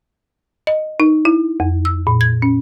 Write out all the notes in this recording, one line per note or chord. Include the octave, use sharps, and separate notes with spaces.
D#5
D#4
E4
F2
E6
A#2
G#6
C#4